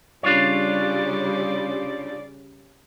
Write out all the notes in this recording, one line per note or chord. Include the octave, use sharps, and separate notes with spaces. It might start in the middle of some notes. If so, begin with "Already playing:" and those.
C#3 G3 D4 F4 C#5 D5